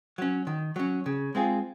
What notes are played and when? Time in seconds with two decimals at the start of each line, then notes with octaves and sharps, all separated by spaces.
0.18 F#3 C#4
0.47 D#3
0.76 F#3 C#4
1.06 C#3
1.35 G#3 C4 F4 G#4